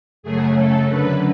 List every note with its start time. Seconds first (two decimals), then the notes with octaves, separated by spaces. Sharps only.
0.23 F#2 C#3 F#3 A3 G#4
0.56 A4
0.88 F#2 D3 F#3 B4